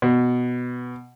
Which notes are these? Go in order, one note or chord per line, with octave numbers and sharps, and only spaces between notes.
B2